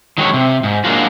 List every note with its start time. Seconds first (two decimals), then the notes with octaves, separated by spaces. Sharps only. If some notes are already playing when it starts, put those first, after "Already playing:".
0.18 D#3 F#3 G#3 C#5
0.34 C3
0.63 G#2
0.84 F#3 G#3 A#3 D4 F4 F#4